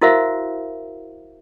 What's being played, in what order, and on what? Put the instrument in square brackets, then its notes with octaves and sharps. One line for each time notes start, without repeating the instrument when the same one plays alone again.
[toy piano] E4 F#4 A#4 C5 E5 F5